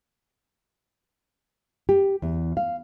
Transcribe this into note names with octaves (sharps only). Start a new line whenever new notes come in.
G4
E2
F5